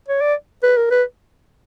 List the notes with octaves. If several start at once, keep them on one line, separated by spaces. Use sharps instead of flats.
C#5
D5
B4
A#4
B4